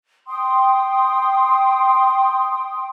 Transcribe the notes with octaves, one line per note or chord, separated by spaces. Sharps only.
G5 C6 D#6